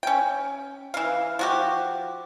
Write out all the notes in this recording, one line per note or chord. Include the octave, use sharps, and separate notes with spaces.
C#4 G5
E3 F5
F3 F#4 G4